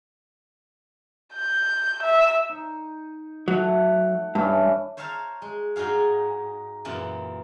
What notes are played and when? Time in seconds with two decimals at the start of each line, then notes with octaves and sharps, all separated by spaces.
1.35 G6
2.03 E5
2.49 D#4
3.48 F#3 A3 F#5
4.35 G2 E3 C#4 D4
4.97 C5 C#5 E5 F5 A5 A#5
5.42 G#3
5.76 G#2 D#4 F#4 G#4 F5
6.85 F#2 A#2 E3